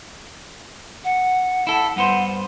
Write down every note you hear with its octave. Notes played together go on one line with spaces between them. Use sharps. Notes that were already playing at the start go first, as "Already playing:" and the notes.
F#5
E4 A4
G2 B3 C5 F#5